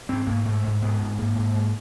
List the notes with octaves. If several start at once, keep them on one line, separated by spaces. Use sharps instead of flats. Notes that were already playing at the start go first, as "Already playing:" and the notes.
G#2 C4
G#2 A#3
G#2 A3
G#2
G#2 B3
G#2
G#2 A#3
G#2
G#2